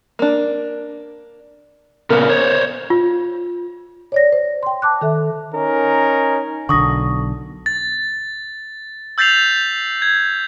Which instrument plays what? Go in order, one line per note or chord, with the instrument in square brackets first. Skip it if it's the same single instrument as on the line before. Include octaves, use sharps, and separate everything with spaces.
[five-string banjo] A#3 D4
[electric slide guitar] A#2 C#3 [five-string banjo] B3 A#4
[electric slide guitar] C5 C#5
[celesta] F4
[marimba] C#5 D5 A#6
C5
G5 C6
A5 D6 F#6
D#3 A4 E5
[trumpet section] C#4 D#4 A#4
[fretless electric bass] B1 D3 [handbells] C#6 D#6 A#6
[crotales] A6
E6 G6 A6 B6 C7 F7
G#6